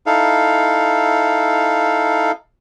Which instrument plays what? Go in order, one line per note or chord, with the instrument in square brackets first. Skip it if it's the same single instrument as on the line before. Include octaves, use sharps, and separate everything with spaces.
[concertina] D#4 E4 A4 F5